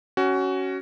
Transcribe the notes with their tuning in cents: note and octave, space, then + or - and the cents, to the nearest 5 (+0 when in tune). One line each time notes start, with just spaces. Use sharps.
C#4 +0 F#4 +20